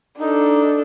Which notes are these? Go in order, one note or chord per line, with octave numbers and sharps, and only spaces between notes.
D4 D#4 A4